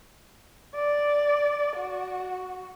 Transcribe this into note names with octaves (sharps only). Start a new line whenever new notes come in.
D5
F#4